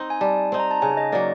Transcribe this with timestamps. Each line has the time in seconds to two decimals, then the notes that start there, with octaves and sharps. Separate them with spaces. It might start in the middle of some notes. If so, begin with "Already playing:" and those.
Already playing: C4 D#4
0.10 G#5
0.21 G3 A5
0.52 C4 D#4
0.60 A#5
0.71 A5
0.82 C#3 G#5
0.97 D#5
1.12 F#3 A#3 D5